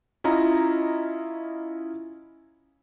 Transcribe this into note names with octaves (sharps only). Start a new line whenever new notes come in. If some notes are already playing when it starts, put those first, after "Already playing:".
C#4 E4 F4 D#5 A#5